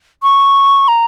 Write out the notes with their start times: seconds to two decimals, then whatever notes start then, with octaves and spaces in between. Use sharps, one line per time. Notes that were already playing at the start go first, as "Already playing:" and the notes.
0.23 C#6
0.88 A#5